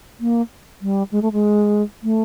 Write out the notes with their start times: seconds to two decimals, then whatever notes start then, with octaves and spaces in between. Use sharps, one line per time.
0.20 A#3
0.81 G3
1.12 G#3
1.22 A3
1.32 G#3
2.03 A3